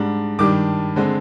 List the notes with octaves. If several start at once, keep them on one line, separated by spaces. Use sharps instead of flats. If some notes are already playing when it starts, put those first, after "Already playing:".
Already playing: G#2 G3 D4
G2 D#3 G3 D4 D6
D3 G#3 C4